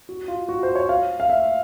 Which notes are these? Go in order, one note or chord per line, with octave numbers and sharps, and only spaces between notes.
F#4
F4
F#4
C5
C#5
F5
F5
E5